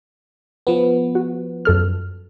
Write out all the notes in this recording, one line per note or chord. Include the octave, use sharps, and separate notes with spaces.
F3 B3
F#4
F#2 A4 F6